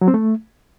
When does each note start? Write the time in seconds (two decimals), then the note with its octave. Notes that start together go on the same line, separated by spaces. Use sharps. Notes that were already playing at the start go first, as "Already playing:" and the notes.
0.01 F#3
0.08 C4
0.14 A3